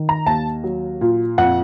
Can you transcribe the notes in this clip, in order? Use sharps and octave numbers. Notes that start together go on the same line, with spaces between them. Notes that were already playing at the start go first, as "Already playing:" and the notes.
Already playing: D#3
A#5
D#2 A5
F#3
A#2
F2 F#5